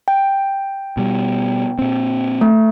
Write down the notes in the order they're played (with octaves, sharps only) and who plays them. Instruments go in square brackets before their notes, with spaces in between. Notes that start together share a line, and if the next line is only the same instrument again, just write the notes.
[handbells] G5
[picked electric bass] B2 G3
A#2 C4
[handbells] A3